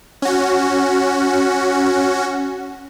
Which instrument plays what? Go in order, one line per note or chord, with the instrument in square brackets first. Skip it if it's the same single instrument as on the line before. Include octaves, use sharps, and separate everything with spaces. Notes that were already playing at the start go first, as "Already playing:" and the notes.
[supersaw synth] C#4 F#4